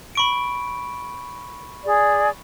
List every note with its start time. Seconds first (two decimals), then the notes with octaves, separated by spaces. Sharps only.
0.15 B5 C#6 D7
1.85 G#4 D5